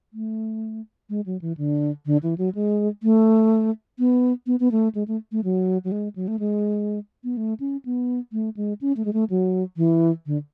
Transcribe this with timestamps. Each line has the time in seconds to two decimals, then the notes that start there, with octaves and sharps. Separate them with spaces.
0.13 A3
1.09 G#3
1.26 F#3
1.41 E3
1.57 D3
2.06 D3
2.23 E3
2.38 F#3
2.55 G#3
3.03 A3
3.99 B3
4.47 B3
4.60 B3
4.72 A3
4.95 G#3
5.08 A3
5.32 A3
5.44 F#3
5.84 F#3
5.92 G#3
6.16 F#3
6.28 A3
6.39 G#3
7.24 B3
7.37 A3
7.60 C#4
7.85 B3
8.33 A3
8.57 G#3
8.81 C#4
8.97 A3
9.05 G#3
9.13 A3
9.30 F#3
9.77 E3
10.26 D3